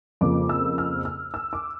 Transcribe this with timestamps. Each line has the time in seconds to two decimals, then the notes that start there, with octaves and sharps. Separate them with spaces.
0.21 F2 C#3 F3 A#3 D6
0.49 E6
0.78 F6
1.05 F6
1.34 E6
1.53 D6